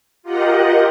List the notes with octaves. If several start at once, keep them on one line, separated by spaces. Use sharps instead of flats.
F4 G4 A#4 D#5 F#5